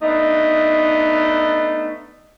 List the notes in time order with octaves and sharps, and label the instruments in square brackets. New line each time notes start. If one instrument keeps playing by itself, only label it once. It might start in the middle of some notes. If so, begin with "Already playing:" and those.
[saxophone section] A3 B3 D4 D#4